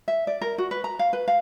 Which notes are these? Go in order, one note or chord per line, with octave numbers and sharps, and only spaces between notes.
E5
D5
A#4
F#4
B4
A#5
F5
B4
F5